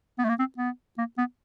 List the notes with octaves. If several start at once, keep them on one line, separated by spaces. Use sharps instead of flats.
B3
A3
A#3
C4
B3
A#3
B3